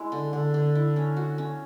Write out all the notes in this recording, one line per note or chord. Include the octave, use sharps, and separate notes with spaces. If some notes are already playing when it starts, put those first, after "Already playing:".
Already playing: G#3 E4
D3
D3
D3
E4
C#4
F#4
C#4